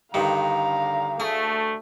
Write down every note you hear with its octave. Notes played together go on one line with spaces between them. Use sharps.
G2 D3 D#3 F5 A#5
D2 A3 G#4